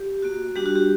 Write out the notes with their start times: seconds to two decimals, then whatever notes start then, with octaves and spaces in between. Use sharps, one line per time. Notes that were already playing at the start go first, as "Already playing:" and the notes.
Already playing: G4
0.22 A#3 F#4
0.56 G3 D4 F#4 G4
0.66 F#4
0.75 G4